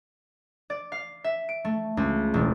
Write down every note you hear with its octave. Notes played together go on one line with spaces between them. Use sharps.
D5
F5
E5
D7
A3
C#2
E1